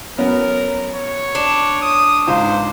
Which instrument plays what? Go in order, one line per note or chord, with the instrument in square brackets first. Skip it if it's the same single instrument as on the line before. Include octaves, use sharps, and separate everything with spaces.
[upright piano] F#3 B3 C#4 [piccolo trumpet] A#4
[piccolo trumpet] C#5
[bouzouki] D4
[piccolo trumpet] D#6
[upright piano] C#2 G#2 [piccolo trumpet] C5